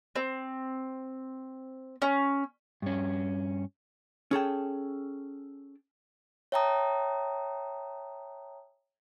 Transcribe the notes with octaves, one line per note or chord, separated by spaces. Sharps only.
C4
C#4
G2 C#4
C#4 G#4 A4 G5
C#5 E5 G5 A5 A#5 D#6